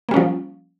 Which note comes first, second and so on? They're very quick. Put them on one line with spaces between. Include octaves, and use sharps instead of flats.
A#3 G3 C#4 F3